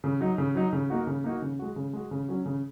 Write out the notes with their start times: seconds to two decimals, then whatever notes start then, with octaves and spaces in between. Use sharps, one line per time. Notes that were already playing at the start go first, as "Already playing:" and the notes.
0.04 C#3
0.21 F#3 D#4
0.38 C#3
0.55 F#3 D#4
0.73 C#3
0.90 A#3 D#4 F#4
1.07 C#3
1.24 A#3 D#4 F#4
1.42 C#3
1.59 G#3 F#4
1.76 C#3
1.93 G#3 F#4
2.11 C#3
2.29 F#3 C#4
2.46 C#3